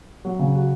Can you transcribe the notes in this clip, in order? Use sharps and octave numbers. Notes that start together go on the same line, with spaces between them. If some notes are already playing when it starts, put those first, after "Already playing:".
F#3
C#3
F#4